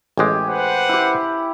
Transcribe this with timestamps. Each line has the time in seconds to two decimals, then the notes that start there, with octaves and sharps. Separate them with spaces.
0.17 A1 G#3 G4 G#5
0.48 B4 C5 F#5
0.89 E4 G4